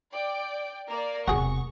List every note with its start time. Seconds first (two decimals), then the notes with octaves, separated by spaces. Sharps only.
0.11 D5 G5 D7
0.90 A#3 A#4 D5
1.28 E1 C3 F#4 G#4 C#6